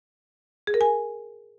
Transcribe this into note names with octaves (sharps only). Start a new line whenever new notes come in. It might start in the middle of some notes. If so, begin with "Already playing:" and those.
G#4
A#4
G#5